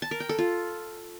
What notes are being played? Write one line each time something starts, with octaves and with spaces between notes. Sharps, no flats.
A5
A#4
G5
A4
F4